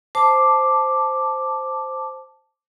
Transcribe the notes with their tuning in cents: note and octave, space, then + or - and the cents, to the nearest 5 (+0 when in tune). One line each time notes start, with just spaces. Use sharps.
C5 +0 A5 +0 D6 +0